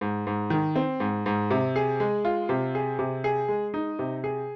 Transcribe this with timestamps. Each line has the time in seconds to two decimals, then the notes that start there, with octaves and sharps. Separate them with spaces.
0.01 G#2
0.27 G#2
0.50 D#3
0.76 C4
1.00 G#2
1.26 G#2
1.50 C3
1.76 G#4
2.00 G#3
2.25 F4
2.49 C3
2.75 G#4
2.99 C3
3.24 G#4
3.48 G#3
3.74 D#4
3.99 C3
4.24 G#4